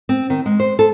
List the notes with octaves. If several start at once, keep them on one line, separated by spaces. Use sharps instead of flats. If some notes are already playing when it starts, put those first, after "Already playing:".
C4
D#3
G#3
C5
A4